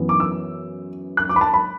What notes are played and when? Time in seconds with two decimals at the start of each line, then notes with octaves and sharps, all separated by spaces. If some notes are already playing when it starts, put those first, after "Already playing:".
Already playing: F#2 E3 B3
0.09 D6
0.20 E6
1.17 F#6
1.29 D6
1.36 B5
1.41 A5
1.54 B5